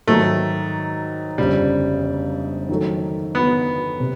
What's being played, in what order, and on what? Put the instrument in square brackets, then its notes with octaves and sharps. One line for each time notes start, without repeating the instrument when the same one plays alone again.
[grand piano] G#2 D#3 F#3 [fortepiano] A3
[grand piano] G1 F2 C#3 [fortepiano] G3
[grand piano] D#3 F#3 A3
[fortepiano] B3
[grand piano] C3